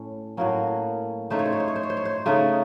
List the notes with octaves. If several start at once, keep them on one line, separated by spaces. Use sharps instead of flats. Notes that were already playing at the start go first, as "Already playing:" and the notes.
Already playing: A2 C#4
A2 F#3 A#3 C#4
C#3 A3 D#4 C5
C#5
C5
C#5
C5
C#5
C5
C#5
C5
C#5
C5
C#3 A3 D#4